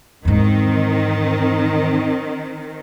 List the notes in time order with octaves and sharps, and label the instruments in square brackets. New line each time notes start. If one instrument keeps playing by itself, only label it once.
[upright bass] E2 G#2 [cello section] D#3 C4